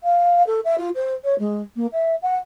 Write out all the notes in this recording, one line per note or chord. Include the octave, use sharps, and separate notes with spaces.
F5
A4
E5
F4
C5
C#5
G#3
A#3
E5
F#5